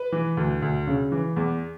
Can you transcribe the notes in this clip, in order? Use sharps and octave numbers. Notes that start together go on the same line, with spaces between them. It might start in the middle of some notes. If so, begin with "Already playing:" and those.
Already playing: B4
E3
D2
D2
C#3
E3
E2